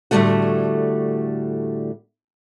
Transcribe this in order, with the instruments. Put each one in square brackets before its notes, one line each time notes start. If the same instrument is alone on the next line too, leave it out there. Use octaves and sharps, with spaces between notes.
[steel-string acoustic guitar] A2 D3 E3 G3 A3 F#4